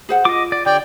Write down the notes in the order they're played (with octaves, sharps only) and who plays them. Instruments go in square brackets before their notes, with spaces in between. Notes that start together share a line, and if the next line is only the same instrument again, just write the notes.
[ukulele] G#4 C5 F#5
[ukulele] F4 [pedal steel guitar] D#5 D6
[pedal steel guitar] D5
[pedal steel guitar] D3 G4 C#5 [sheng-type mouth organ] D5 G5